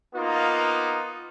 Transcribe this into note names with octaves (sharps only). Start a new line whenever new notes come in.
A#3 B3 D#4 F4